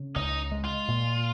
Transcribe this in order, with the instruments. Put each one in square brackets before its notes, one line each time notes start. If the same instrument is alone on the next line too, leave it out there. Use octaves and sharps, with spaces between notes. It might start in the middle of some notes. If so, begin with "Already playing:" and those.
Already playing: [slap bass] C#3
[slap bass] C#2 [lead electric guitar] D#4
[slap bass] G#3
[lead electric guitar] F4
[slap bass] A#2